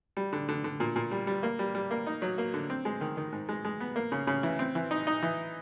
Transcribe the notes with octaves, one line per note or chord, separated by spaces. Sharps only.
G3
D3
D3
D3
A#2
A#2
G3
G3
A#3
G3
G3
A#3
D#4
F#3
A#3
D3
C4
G#3
D#3
D#3
G#2
G#3
G#3
B3
A#3
C#3
C#3
E3
C4
E3
D#4
D#4
E3